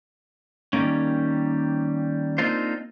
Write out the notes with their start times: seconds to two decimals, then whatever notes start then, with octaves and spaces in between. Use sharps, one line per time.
0.73 D#3 E3 G3 A#3 C#4
2.38 A#3 C4 D4 D#4 F4 C5